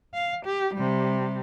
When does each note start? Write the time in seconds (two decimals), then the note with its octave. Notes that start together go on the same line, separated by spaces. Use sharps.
0.14 F5
0.46 G4
0.75 C3 G3